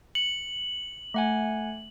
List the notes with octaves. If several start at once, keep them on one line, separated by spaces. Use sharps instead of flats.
C#7 F#7
A3 F#5 G#5